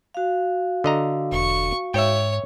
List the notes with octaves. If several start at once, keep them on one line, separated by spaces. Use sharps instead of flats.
F#4 F5
D3 D#5 A#5
E1 C#6
G#2 C#5 E5 G5